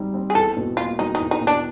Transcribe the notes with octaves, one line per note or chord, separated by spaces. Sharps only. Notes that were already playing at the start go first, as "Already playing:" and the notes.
Already playing: G3 C4 D#4
C4
G#4
E2 A4
B2
A#3 F4
F#3 D#4
D#4
E2
D#4
B2
D4